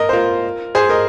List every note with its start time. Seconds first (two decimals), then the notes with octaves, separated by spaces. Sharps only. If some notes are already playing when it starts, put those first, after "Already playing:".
Already playing: A#4 D#5
0.09 C5
0.13 F4 A#4
0.75 G#4 C5
0.89 A#4 D#5